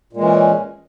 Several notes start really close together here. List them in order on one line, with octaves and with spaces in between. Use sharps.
A#2 G#3 E3 C#4